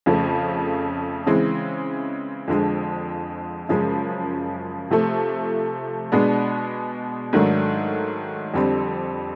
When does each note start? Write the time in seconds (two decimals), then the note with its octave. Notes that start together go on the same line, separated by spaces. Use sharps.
0.06 F2 C#3 F3 A3
1.26 C#3 E3 G#3 C4
2.48 F2 D3 F3 G#3
3.69 F#2 C#3 F3 G#3
4.91 C3 F3 A3
6.12 B2 G#3 B3 D4
7.33 G#2 D#3 F#3 A3 D4
8.54 F2 D3 G3 C4